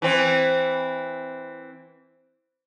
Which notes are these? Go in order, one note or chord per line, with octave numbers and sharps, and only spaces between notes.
E3 C4